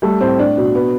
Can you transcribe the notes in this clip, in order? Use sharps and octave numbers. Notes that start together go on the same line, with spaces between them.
G3 A3 A4
A2 C4 C5
D4 D5
B2
B3